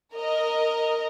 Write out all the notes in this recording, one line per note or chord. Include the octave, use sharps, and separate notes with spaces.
A#4 D#5